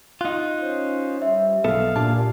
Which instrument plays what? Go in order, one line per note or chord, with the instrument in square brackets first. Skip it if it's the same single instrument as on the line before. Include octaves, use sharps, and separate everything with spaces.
[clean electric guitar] D#4 F4 [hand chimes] F#6
[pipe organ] C#4 C5
[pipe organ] G3 [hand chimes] E5
[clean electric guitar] B1 B3 A4 [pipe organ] F5
[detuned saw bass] A#2 [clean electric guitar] D4 A5 [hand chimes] G4